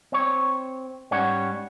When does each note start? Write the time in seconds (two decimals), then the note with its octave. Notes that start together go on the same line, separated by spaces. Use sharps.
0.12 C4 C#5
1.11 G#2 G3 C#4 C#5 F#5